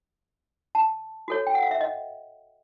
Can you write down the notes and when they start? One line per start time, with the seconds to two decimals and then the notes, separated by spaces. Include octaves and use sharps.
0.75 A5
1.28 F#4 A4 C#5
1.47 G5
1.55 F#5
1.63 F5
1.71 E5
1.81 D#5